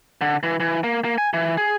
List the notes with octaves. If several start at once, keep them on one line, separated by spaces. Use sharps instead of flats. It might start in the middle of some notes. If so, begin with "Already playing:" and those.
D3
E3
E3
A#3
A#3
G#5
E3
G#4